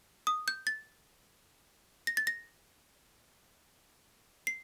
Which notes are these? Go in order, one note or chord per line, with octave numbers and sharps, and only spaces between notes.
D#6
G6
A6
A#6
A6
A#6
C7